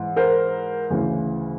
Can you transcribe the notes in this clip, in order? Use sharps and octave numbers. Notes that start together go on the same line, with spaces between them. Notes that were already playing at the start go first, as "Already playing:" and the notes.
Already playing: G#2 E3
A#4 C5
D2 C#3 E3